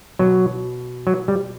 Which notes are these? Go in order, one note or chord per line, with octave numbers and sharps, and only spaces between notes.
B2 F#3
F#3
G3